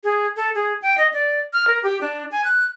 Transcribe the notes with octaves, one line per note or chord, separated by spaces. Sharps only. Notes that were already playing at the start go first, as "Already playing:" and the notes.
G#4
A4
G#4
G5
D#5
D5
F6
A#4
G4
D4
G#5
F#6